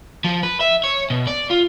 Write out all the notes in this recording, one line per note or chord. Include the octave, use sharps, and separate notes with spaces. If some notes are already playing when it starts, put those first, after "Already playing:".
F3
B4
E5
C#5
B2
D5
F4